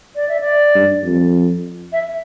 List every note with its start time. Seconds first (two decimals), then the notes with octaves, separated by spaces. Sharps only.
0.15 D5
0.29 E5
0.41 D5
0.75 G2
1.04 F2
1.93 E5